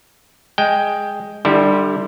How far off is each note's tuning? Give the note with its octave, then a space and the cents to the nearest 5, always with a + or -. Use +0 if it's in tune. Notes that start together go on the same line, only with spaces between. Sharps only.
G#3 +0 G5 +5
D3 +30 G3 +0 E4 -15